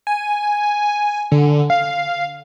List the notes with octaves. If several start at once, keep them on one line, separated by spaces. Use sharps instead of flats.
G#5
D3
F5